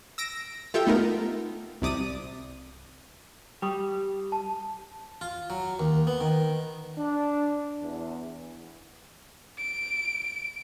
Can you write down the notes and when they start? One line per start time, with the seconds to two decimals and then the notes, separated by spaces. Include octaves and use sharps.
0.18 E6 A#6 D7
0.74 F4 G4 A4 E5 G5 E6
0.87 A3 B3 D#4 F4 A#4
1.82 C2 C3 D5 D#6 D#7
3.62 G3 G5 C#6 D#6
4.32 A5
5.21 F4
5.50 F#3
5.79 D#2
6.07 B3
6.21 D#3
6.97 D4
7.82 E2
9.58 D7